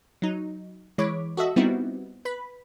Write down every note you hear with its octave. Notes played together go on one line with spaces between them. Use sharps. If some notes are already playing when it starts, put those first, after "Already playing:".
F#3 D#4
E3 G#3 C#5 B5 D6
F#4 A4 D#5 E5
G3 B3 C4 D#4 E4 F#4
B4 B5